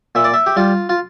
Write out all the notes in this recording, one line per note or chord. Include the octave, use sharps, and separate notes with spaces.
A#2 E5
D5
E5
G4
G3 F4
F4